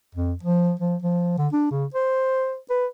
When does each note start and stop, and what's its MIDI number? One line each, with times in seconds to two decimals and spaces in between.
0.15 0.33 41
0.43 0.73 53
0.79 0.96 53
1.02 1.33 53
1.38 1.47 50
1.53 1.70 62
1.71 1.85 49
1.94 2.58 72
2.70 2.86 71